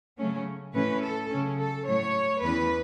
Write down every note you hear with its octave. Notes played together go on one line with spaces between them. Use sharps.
C#3 F#3 A3 C#4
A2 E3 A3 C#4 B4
A4
C#3 F#3 C#4
A4
A2 F#3 A3 C#5
E2 E3 C#4 B4